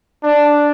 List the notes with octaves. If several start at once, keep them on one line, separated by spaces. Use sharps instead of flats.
D4